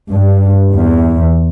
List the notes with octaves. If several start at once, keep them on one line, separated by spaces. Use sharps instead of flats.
G2
E2